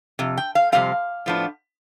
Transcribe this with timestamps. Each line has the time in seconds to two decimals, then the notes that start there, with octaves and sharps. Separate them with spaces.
0.19 F2 C3
0.37 G5
0.55 F5
0.72 F2 C3 G3 C4 F5
1.26 A2 F3 B3 D4